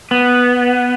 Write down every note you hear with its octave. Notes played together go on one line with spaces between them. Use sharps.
B3